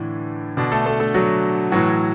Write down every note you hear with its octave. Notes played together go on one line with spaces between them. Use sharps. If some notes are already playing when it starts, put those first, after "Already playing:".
Already playing: A2 D3 E3 D4
B2 D3 D4
A3 A4
A3 A4
A3 A4
F#3 F#4
A2 E3 F#3 F#4